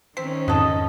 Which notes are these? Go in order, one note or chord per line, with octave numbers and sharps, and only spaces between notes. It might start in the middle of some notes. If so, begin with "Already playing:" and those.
D#3 C4 C#4 B6
F2 G#2 C#3 F#3 A4 D#5